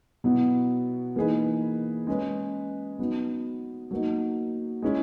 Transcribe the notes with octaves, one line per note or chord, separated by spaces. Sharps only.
B2 F#3 B3 E4
E3 A#3 D#4 G#4 B4
G#3 C#4 G#4 B4
F#3 B3 D#4
F#3 A#3 D#4
G#3 C#4 E4